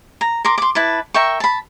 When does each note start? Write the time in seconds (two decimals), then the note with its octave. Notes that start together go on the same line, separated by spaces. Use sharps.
0.21 A#5
0.45 A#4 C6 D6
0.58 C6 D6
0.75 E4 B4 A5
1.14 A#4 E5 G5 C#6
1.40 A5 B5